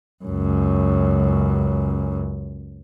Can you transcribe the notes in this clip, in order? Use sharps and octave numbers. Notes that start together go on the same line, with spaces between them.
C#2 F#2